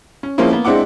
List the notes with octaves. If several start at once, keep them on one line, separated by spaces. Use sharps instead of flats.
C#4
F3 G#3 A#3 C4 C#4 E4
A#3 B3
G#3 C4 D4 E4 F#5 D6